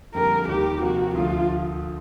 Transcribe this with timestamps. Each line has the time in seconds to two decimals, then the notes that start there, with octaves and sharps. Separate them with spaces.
0.15 F2 D3 G3 A#3 A#4
0.48 D#2 D#3 G3 A#3 G4
0.82 C3 F3 A#3 F#4
1.14 D2 D3 F3 F4